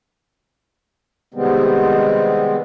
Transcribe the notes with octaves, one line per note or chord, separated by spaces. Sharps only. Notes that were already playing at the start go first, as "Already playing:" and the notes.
C3 D#3 G3 G#3 B3 C4